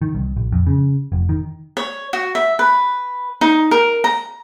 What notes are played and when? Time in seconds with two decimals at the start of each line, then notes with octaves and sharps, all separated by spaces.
0.02 D#3
0.15 C2
0.37 A#1
0.52 F2
0.67 C#3
1.12 F1
1.29 D#3
1.77 C#5
2.13 F#4
2.35 E5
2.59 B4
3.41 D#4
3.71 A#4
4.04 A#5